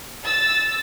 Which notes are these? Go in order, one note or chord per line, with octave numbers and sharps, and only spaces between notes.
E6 A6